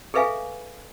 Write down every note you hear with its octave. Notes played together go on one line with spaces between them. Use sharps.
G#4 A4 B4 E5 F5 G#5